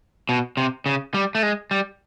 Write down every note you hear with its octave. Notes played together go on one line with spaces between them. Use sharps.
B2
C3
C#3
G3
A3
G#3
G3